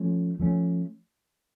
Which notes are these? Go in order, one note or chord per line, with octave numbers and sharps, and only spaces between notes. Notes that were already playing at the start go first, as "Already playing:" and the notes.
Already playing: F3 A3 C#4
F3 A3 C#4